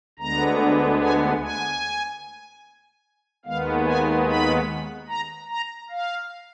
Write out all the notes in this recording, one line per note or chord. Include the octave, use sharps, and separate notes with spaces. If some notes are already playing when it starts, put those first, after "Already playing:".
D2 D3 G#3 B3 A#5
G#5
G#5
D#2 D#3 G#3 B3 F5
G#5
B5
A#5
A#5
F5